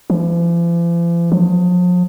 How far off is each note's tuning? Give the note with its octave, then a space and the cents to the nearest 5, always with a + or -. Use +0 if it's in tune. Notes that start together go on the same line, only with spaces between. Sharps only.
F3 -45
F3 +40